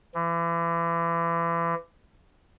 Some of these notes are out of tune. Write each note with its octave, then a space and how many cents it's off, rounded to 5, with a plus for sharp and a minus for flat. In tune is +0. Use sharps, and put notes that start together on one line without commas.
E3 +35